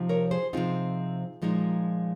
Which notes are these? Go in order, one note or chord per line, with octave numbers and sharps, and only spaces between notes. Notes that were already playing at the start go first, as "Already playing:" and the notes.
Already playing: C3 F3 C4 D#4
A#4 C#5
G#4 C5
C3 F3 C4 D#4 F4 G#4
A#2 F3 G#3 D#4